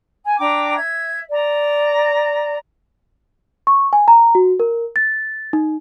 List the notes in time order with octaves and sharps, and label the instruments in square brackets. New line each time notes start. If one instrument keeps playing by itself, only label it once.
[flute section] G#5
D4 G5 A#5 D6
E5 G#6
D5 A#5
[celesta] C#6
G#5
A#5
F#4
A#4
A6
D#4